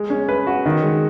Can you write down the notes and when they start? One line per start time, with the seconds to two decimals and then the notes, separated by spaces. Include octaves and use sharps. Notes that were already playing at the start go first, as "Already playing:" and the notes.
Already playing: G#3
0.10 C#4
0.29 B4
0.47 F#4
0.66 D#3
0.83 G#3